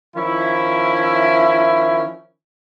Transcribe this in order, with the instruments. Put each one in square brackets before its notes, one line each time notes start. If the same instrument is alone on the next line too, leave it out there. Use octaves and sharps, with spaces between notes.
[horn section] D#3 F3 C#4 E4